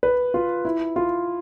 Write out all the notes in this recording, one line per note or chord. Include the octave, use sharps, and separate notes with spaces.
B4
F4
E4
F4